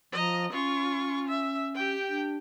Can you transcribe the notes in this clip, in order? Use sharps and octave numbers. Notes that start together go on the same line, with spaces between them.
F3 D#5 A#5
C#4 F4 C#6
E5
G4 G5
D4